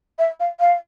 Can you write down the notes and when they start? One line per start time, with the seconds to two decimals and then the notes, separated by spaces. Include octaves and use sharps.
0.19 E5
0.40 F5
0.60 F5